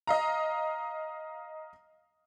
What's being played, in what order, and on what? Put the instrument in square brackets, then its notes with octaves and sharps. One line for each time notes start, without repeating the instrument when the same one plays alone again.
[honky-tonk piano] D#5 F5 A#5